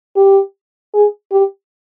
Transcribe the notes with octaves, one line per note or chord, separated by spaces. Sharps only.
G4
G#4
G4